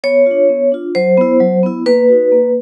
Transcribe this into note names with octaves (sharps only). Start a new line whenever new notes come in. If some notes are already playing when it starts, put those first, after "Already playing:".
B3 C#5
D4 F4
B3
D4 F4
F#3 C5
B3 E4
F#3
B3 E4
A#3 B4
D#4 F#4
A#3